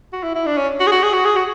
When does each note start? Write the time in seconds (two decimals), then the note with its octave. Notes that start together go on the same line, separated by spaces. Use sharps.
0.13 F#4
0.23 E4
0.35 E4
0.46 D4
0.57 C#4
0.80 F#4
0.87 G#4
0.92 F#4
1.03 G#4
1.13 F#4
1.25 G#4
1.36 F#4